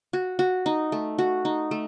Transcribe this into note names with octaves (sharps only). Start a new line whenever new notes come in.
F#4
F#4
D#4
A3
F#4
D#4
A3